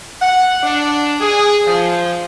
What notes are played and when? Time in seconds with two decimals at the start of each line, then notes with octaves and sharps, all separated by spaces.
0.20 F#5
0.62 D4
1.20 G#4
1.66 F3